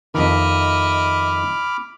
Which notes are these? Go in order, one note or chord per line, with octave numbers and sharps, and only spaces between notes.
F2 D#3 D#5 E5 B5 D6 F6